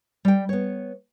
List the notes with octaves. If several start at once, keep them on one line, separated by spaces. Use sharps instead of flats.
G3 G5
B3 C#5